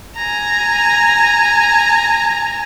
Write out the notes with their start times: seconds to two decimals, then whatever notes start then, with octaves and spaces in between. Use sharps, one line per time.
0.17 G#5 A#5